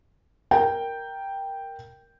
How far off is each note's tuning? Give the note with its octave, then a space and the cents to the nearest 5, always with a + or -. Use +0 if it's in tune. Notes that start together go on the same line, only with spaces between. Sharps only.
A#4 +0 G5 +0